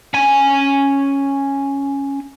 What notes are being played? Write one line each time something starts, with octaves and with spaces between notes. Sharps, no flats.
C#4 G#5